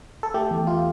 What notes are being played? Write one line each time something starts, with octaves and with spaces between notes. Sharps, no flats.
A4
A3 G4
E2
F4